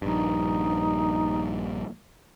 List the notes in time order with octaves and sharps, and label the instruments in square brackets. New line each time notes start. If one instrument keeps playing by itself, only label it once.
[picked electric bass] A#1 G2 [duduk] D#4